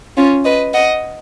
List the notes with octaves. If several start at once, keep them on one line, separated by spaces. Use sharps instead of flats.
C#4 F4
B4 D#5
D#5 F#5